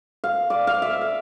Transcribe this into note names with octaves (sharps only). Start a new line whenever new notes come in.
F5
D5
F5
E5
F5